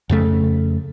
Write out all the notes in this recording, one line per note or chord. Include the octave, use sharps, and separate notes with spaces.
F2 C#3 A3